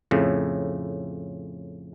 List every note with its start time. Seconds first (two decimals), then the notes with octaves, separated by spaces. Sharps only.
0.11 F2 A2 C#3